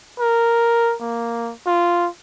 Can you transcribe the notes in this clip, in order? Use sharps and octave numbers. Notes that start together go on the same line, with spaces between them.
A#4
A#3
F4